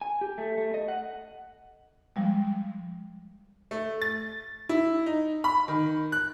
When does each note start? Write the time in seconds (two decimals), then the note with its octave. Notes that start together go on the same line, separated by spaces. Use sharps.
0.01 G#5
0.21 G4
0.38 A3
0.58 A3
0.74 D#5
0.88 F#5
2.16 F3 G3 G#3
3.71 A3
4.02 A6
4.69 E4
5.06 D#4
5.44 B5
5.68 D#3
6.12 F#6